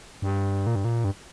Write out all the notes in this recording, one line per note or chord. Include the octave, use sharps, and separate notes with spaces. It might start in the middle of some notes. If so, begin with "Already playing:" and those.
G2
A#2
G2
A#2
G2